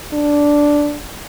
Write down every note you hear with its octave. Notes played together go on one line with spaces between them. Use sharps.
D4